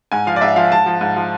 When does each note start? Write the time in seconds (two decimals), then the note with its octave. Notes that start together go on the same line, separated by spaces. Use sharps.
0.12 G#2 G#5
0.27 F3 F5
0.36 D5
0.41 G#2 E5
0.56 F3 F5
0.72 G#2 A5
0.86 F3
1.01 G#2
1.16 F3